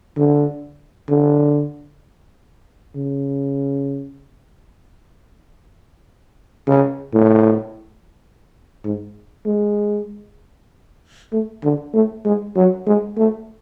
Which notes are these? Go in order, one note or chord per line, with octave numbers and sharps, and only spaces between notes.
D3
D3
C#3
C#3
A2
G#2
G#3
A3
D3
A3
G#3
F#3
G#3
A3